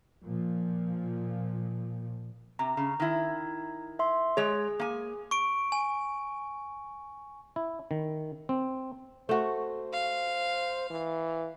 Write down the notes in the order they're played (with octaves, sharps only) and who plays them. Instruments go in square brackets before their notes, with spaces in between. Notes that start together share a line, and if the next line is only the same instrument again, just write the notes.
[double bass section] A#2 F3
[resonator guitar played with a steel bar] C3 [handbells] A#5
[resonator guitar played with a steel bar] C#3
D#3 E4
[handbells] E5 C6
[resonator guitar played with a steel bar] G#3 C#5 [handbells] G#4
[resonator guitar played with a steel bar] A#3 G#5
[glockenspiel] C#6 D7
G#5
[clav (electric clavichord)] E4
D#3
C4
[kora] A3 F#4 [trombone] C5
[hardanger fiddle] F5
[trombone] E3